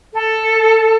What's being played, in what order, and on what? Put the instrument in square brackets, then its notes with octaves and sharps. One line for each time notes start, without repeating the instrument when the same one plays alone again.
[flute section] A4